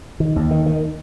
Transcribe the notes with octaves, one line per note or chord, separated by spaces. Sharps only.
D#3
D#2
D#3
D#3